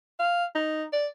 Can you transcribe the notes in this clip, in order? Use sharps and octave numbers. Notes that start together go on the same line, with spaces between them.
F5
D#4
D5